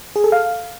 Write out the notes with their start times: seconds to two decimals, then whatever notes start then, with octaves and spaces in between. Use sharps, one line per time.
0.16 G#4
0.24 A4
0.32 F5